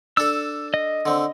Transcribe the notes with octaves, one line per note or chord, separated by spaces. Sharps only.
D4 A4 E6
D#5
D3 C4